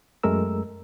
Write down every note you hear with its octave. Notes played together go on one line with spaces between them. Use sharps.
F#2 G#3 A3 A#4 E6